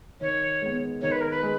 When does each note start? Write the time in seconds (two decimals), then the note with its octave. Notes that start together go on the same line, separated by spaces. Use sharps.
0.21 D#3 C#5
0.62 G#3 B3
1.02 D#3 C#5
1.12 B4
1.21 A#4
1.30 B4
1.43 G#3